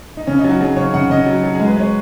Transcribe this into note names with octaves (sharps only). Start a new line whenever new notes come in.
D#4
C#3 C#4
D#4
F#3 F#4
F#3 G#4
C#3 C#5
C#3 F#5
C#3 D#5
F#3
F#3
G#4
G#3
B4
G#3 C#5